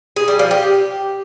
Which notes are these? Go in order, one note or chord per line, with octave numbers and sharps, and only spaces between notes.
G#4
G3
F3
G4